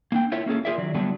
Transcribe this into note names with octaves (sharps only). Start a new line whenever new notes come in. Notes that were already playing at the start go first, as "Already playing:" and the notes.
A#3 D4 G5
E4 F4 A#4 C#5 E5
A#3 C#4 G#4 A4
F4 G4 G#4 A#4 D5 E5
D#3 F#3 D5
D3 F#3 G3 A3 B3 D4